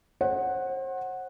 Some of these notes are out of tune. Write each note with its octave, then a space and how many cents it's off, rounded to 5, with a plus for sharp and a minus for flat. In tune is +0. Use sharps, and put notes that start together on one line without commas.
C5 +40 F#5 +0